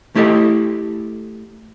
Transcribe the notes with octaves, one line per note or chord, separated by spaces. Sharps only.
A3 E4 G4 A4 D#5